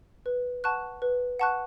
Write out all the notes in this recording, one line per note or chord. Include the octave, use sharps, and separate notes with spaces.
B4
F#5 A5 C#6 F#6
B4
F#5 A5 C#6 F#6